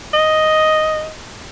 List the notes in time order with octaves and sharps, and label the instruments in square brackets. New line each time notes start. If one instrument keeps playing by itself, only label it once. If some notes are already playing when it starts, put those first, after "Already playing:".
[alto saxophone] D#5